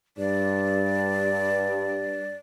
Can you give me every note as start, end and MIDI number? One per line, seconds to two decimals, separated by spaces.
0.17 2.33 43
0.17 2.35 74